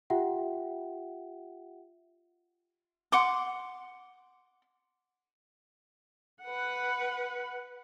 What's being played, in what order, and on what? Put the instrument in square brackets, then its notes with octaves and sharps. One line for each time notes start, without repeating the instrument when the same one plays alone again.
[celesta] F4 G4 E5 F#5 G5
[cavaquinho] F#5 C6 D6
[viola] B4 F#5